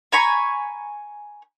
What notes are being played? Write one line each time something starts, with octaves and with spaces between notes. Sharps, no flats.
G#5 A#5 B5 C#6